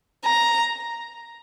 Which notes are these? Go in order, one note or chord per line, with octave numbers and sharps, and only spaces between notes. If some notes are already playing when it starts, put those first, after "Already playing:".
A#5